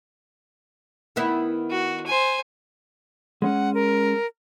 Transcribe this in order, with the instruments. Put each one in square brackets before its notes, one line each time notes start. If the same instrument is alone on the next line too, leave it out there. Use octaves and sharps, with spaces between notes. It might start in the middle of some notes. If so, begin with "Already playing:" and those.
[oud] D#3 B3 E4
[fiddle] F#4
C5 G#5
[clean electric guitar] G#3 C#4 [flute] F#5
[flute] A#4